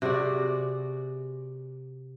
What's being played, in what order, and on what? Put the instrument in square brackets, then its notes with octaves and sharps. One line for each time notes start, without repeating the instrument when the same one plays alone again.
[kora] C3 F#4 G#4 D5